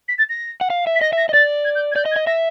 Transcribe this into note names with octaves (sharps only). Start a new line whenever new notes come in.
B6
A6
A#6
F#5
F5
E5
B6
D#5 A#6
E5 A#6
D#5
D5 A6
G#6
G6
G#6
D5 G6
D#5
G#6
D#5
E5 A#6